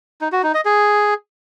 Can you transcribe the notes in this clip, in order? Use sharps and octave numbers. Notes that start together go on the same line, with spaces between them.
D#4
F#4
D#4
D#5
G#4